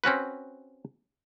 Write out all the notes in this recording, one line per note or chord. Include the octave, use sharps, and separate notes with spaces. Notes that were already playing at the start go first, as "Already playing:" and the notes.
C4 C#4 F#4 B4